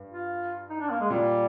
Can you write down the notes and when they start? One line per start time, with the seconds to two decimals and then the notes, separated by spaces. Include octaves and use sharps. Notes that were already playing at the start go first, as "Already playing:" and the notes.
Already playing: G2
0.10 F4
0.70 D#4
0.80 D4
0.91 A#3
1.01 G#3
1.10 A#2 G3